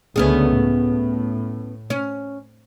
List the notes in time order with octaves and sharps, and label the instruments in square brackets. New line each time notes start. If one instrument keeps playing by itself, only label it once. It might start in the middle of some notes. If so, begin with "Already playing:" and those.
[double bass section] C#2 D3 A3 [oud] B3 C#4 G#4
[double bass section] A2
[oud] C#4